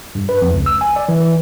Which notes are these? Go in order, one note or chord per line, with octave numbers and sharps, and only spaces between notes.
G2
B4
F2
C#2
E6
G#5
D5
E3
E3